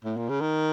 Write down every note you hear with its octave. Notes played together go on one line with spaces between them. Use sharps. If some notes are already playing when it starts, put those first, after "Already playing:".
A2
A#2
C#3
D#3